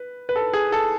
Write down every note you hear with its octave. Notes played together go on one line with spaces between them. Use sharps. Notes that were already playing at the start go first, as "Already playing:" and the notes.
Already playing: B4
B4
A4
G#4
A4